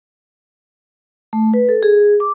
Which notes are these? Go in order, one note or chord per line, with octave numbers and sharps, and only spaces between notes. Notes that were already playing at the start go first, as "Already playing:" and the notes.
A3
B4
A4
G#4
D6